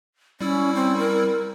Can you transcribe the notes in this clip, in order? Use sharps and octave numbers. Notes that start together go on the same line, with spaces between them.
G3 C#4 E4 E6
C4
A#4